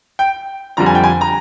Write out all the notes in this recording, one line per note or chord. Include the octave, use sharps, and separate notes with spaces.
G5
F2 D3 G3 A#5
G#5
G5
G#5
A#5